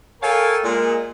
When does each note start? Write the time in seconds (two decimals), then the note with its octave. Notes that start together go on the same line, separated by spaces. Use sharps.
0.22 A4 A#4 C#5 F5 G5 G#5
0.64 A#2 G#3